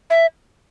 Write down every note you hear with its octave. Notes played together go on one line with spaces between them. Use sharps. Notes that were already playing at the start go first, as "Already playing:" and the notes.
E5